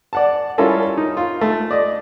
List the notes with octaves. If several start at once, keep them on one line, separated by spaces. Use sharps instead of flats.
D5 F#5 A5
G3 C#4 E4 F4 A4 A#4
D#4
F4
A3
D5 D#5